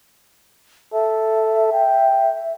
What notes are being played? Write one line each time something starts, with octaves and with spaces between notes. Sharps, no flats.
A4 E5
G5